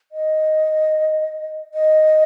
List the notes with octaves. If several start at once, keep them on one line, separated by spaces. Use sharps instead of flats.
D#5
D#5